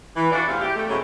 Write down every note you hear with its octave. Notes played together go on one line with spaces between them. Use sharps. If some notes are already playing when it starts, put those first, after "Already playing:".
E3
D4 F4 F#4 A4 D5
E2 C3 A3 C5 E5 F5
G4
A3
B2 F#3 G#3 C4 C#4 G#4